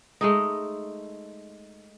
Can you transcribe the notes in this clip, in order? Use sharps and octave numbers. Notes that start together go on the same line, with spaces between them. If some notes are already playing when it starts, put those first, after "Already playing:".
G#3 A3 D#4